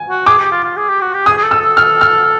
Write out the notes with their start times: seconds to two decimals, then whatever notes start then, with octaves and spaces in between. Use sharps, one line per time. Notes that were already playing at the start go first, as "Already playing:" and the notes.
Already playing: G#5
0.10 F#4
0.26 G#4 D6
0.39 G4
0.52 F4
0.64 F4
0.76 G#4
0.89 G4
1.01 F#4
1.14 G4
1.26 G#4 D#6
1.37 G#4
1.43 A4
1.51 E6
1.60 A4
1.77 F6
2.01 F6